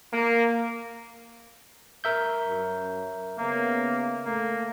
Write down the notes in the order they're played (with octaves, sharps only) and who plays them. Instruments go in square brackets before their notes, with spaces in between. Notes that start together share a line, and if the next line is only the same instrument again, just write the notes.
[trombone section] A#3
[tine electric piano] A#4 E5 G6
[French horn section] F#2
[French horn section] C#3 B3 [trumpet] A#3
[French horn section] A3 [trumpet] A#3